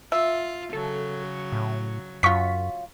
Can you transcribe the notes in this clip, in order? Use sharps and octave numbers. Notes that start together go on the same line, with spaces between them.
F4 E5
C#3 F#3 A4
A2
F#2 F#3 F4 C#6 B6